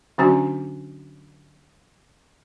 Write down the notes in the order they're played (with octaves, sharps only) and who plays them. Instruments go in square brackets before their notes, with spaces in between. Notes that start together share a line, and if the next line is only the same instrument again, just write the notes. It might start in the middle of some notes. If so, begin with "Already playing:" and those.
[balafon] D3 F#3 C#4 D4 F#4 G#5